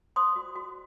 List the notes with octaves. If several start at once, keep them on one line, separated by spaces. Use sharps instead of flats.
C5 C6 D#6
F#4
F#4